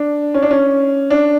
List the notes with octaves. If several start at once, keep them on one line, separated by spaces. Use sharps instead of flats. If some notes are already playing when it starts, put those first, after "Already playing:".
Already playing: D4
C#4
D4
C#4
D4